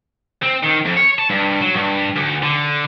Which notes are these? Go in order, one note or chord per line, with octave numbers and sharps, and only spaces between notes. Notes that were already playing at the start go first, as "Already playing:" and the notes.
C4
D#3
F2
C#5
A5
G2
F#3
G2
D2
D3